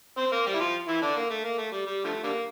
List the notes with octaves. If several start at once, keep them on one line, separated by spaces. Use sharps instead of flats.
C4 C5
A#3 A#4
G3 G4
E4
F3 F4
E3 E4
D3 D4
A#3
A3
A#3
A3
G3
G3
D3 F3 A3
D3 G3 A#3